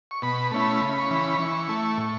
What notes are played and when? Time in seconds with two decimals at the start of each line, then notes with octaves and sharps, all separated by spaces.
0.11 C#6
0.22 B2 B5
0.51 A3 C#4 E4 B5
0.81 C#3 B5
1.00 C#6
1.10 E3 C#4 B5
1.39 E3 C#6
1.69 A3 E4
1.97 A2